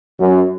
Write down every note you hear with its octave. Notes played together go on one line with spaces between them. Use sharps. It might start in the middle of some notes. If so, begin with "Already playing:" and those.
F#2